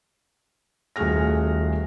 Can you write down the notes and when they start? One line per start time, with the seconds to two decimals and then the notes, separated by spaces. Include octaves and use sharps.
0.96 D#1 A3 F#4 G#4 F6 A#6